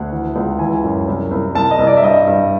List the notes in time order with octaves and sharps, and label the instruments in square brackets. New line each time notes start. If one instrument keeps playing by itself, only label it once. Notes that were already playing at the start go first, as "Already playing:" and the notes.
Already playing: [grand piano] D2 F#5
E3
C#2
E3 G#5
F#2
C2
C2
C2 A5
D#5
C2
D5
E5
G2 D#5
G2